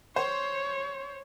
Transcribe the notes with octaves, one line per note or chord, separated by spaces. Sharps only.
C5 C#5